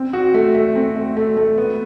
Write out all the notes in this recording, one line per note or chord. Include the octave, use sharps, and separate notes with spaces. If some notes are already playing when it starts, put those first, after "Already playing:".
Already playing: C4
F#4
A3
A3
C4
A3
A3
A3
B3